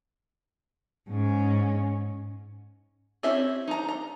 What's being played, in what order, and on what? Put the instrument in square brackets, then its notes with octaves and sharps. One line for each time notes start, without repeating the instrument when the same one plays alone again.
[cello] G#2 C#4
[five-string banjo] C4 C#4 E4 G4 E5
D#4 A#5
A#5